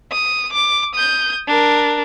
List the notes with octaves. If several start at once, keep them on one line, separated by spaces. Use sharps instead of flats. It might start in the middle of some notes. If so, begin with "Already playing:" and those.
D#6
D6
D#6 G6
D4 A#4